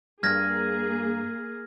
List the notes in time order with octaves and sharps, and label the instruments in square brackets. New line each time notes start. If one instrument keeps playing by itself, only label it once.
[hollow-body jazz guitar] G2 [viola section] A#3 G#4 [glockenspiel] F6 G#6 A#6